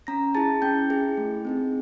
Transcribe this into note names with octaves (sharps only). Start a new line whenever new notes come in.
C#4 A#5 A#6
E4 G#4 A5 A6
C#4 G5 G6
E4 G#4
A3
C4 D#4 G#4